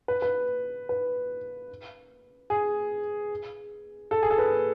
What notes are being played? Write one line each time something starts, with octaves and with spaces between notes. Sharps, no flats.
B4
B4
B4
G#4
A4
G#4
A4
B4